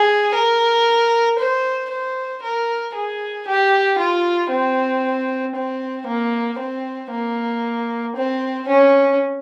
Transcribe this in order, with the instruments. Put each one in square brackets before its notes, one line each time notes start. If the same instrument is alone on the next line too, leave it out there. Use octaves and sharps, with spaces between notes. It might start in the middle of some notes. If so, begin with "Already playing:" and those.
Already playing: [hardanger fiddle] G#4
A#4
C5
C5
A#4
G#4
G4
F4
C4
C4
A#3
C4
A#3
C4
C#4